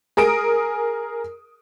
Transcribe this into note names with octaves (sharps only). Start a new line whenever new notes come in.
G#4 A#4 D#6 D7